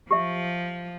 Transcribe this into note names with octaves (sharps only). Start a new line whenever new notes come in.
F3 G4 E5